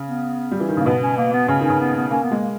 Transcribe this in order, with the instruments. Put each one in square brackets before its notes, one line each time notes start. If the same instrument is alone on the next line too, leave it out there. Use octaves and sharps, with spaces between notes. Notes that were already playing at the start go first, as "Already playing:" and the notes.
Already playing: [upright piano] C#3
[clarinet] B3
[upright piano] G3
E3
D#3
[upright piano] C#3 [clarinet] A#3
[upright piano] B2 [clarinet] B3
[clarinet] C#4
A#3
B3
[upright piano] C#3 [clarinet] C#4
[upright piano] D#3
[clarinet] C#4
[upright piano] C#3
[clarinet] B3
B3
[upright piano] A#3 [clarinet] C#4
[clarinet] B3
[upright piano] G#3 [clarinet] A#3